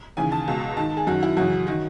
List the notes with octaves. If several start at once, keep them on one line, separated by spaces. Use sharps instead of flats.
D#2 C#3 E3 G#5
A5
C#2 B2
G#2 D#3 A5
G#4
F#2 D#3 F#4
E4
F#2 C#3 E3 F#4
D#3 F#4